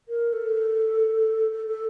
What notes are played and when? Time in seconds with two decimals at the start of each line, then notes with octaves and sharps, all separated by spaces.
0.09 A#4
0.33 A4
1.52 A4
1.67 A4